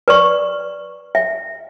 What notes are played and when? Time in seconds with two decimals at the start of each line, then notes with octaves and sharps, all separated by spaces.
0.08 B4 D5 C#6
1.15 E5